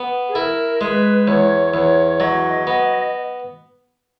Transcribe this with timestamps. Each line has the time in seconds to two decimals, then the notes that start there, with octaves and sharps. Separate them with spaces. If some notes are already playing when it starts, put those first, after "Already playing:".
Already playing: B3
0.29 G#4
0.35 E4 A#4
0.80 G#3 B4
1.28 E2 C#5
1.74 E2 C#5
2.20 F#3 D#5
2.67 B3